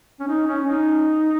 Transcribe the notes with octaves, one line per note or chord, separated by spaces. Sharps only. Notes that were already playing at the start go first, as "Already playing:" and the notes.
C#4
D#4
C#4
D#4